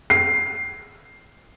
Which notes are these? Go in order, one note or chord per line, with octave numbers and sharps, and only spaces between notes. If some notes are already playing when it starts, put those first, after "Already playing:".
C7